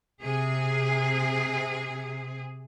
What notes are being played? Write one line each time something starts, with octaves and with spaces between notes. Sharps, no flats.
C3 G#4